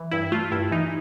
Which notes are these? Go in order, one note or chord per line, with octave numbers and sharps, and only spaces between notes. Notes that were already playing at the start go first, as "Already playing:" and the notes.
Already playing: E3
G2 E4
A3 F4
G2 E4
E3 D#4